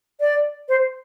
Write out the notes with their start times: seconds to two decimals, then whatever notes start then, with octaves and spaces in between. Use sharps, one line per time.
0.20 D5
0.69 C5